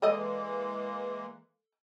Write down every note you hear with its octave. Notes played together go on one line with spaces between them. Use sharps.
E3 G#3 A#3 A4 D5 D#5